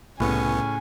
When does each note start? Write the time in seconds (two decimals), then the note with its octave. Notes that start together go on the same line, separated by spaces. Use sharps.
0.20 C2 A2 C#3 B3 C#4 G#5